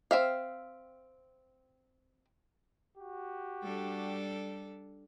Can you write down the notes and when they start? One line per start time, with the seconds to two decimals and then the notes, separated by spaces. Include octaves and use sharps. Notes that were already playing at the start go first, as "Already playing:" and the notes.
0.11 C4 E5 F5
2.95 F#4 G4
3.63 G3 D4 A4